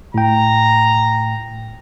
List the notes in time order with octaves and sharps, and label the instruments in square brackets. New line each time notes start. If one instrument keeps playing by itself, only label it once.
[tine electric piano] A2 G5 [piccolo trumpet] A#5